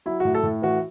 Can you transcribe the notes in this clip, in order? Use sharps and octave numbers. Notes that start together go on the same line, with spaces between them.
F#3 E4
A2 F#4
A4
A2
E3 F#4